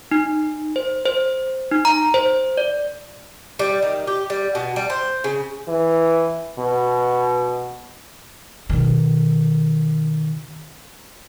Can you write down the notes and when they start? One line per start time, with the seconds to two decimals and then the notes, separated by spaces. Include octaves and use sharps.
0.11 D#4
0.76 C5
1.05 C5
1.71 D#4
1.85 A#5
2.14 C5
2.57 D5
3.59 G3
3.82 D#3
4.07 G4
4.30 G3
4.55 B2
4.76 G3
4.90 C5
5.24 C#3
5.68 E3
6.59 B2
8.69 B2 D#3